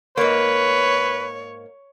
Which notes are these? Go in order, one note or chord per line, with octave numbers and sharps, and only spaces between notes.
G#2 A#3 B4 C#5